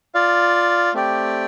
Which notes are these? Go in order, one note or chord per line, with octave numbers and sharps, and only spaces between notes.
F4 D5 F5
A3 C4 G4 D5 G5